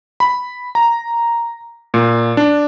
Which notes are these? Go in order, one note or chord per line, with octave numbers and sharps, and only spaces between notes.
B5
A#5
A#2
D4